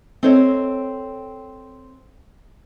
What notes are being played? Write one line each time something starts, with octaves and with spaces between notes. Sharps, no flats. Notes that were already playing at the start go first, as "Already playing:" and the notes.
C4 A4 C5 C#5 D#5